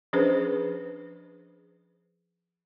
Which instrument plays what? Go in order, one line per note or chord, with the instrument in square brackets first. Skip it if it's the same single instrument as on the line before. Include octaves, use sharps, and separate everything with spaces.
[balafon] F3 C#4 D4 G#4 B4 C5